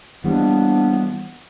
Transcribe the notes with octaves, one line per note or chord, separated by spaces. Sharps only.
E3 F3 G3 A#3 B3 D4